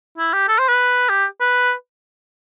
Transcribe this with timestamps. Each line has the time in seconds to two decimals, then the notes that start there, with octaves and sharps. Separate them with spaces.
0.18 E4
0.33 G4
0.48 A4
0.59 C5
0.69 B4
1.10 G4
1.41 B4